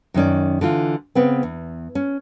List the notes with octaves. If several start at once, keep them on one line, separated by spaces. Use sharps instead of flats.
F#2 D#3 C#4 D5
D3 E3 F4
C#3 B3 C4
E2
C#4